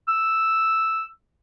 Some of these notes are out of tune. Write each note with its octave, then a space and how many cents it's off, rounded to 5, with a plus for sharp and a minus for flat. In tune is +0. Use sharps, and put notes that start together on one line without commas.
E6 +0